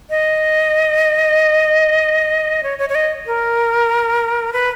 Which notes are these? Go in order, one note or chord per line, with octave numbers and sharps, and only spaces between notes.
D#5
C#5
C#5
C#5
D#5
A#4
B4